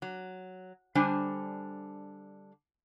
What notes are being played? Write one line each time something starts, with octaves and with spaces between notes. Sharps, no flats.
F#3
D3 G3 D4 C5 G#5